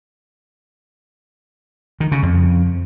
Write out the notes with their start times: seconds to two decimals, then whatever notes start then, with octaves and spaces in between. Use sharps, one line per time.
2.00 D#3
2.12 C#3
2.23 F2